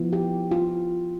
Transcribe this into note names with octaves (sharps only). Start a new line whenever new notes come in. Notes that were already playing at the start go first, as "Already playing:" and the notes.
Already playing: F3 B3 E4
G4
F4